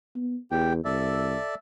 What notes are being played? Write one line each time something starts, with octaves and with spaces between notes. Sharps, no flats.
B3
E2 G4 G5
C2 A4 D5 E5